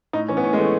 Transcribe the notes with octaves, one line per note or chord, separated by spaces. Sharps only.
A2 D#4
E3 C#4
B3
A2 C#4
G#3
E3 A3